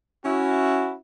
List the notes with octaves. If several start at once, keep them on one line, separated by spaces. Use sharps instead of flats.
C#4 E4 F#4